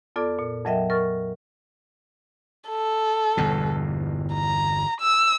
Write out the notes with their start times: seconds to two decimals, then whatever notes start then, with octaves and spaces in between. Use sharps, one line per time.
0.16 F2 B3 F4 A4 D5 D6
0.39 A#2
0.65 F2 F#3 A#4 D#5 E5 G5
0.90 A#4 C#6 F6 A6
2.69 A4
3.37 G1 E2 B2
4.34 A#5
5.00 E6